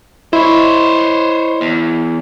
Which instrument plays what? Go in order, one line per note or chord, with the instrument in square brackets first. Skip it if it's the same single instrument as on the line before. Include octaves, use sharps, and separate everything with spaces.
[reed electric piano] E4 [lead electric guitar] C5 C#5 [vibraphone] D#5 B5
[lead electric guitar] E2